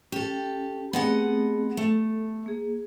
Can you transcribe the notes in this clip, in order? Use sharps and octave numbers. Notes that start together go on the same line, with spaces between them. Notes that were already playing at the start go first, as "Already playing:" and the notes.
C#4 G4 A4
A3 B3 C4 G#4 D#5 F#5
A3 A4
A#3 G#4